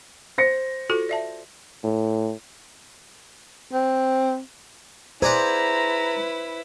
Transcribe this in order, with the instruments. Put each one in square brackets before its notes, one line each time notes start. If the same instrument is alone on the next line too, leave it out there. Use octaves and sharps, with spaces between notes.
[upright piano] C5 A#6 C#7
[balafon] F4 F#4 A4
D5 E5 A5
[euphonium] A2
[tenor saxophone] C4
[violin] E4 B4 [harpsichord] G#4 D5 F#5 [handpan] C5 [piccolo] A#5